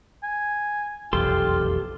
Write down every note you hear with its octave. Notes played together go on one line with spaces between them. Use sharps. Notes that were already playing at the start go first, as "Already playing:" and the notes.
G#5
F1 B1 E2 F4 G4 A4 C6